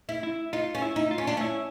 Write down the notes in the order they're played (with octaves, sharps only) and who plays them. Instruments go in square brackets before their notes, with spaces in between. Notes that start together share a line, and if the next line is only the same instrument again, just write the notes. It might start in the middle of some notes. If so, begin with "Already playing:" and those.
[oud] E4
[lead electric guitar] E4
[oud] D#4 [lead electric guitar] F4
[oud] C#4
[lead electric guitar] E4
[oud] D#4
[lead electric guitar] F4
[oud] C#4
D4
[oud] C#4 [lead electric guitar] E4